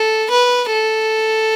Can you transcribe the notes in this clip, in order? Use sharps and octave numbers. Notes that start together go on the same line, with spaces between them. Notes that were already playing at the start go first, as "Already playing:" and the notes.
Already playing: A4
B4
A4